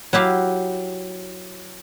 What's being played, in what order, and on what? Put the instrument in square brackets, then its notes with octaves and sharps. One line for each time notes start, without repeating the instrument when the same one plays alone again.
[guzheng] F#3 E4 G4 F5